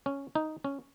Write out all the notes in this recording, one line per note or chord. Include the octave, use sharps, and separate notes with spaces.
C#4
D#4
C#4